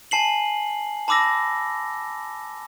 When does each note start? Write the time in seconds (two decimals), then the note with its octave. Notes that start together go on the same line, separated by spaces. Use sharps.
0.11 G#5 A5 C7 F#7
1.08 A5 B5 D6 E6 A#6